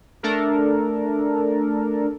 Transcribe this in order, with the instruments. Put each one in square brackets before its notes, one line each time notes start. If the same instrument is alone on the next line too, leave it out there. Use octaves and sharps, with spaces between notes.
[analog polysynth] A3 D4 A4 A#4